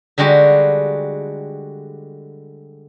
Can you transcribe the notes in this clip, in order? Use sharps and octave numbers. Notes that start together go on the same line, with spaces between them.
D3 G3 G#3 F#4 G4